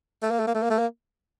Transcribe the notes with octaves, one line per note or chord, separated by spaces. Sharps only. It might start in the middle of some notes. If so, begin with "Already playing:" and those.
A3
A#3
A3
A#3
A3
A#3
A3
A#3